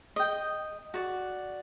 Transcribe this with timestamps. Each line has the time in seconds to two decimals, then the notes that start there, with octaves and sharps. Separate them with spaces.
0.16 D#5 G5
0.94 F#4 D5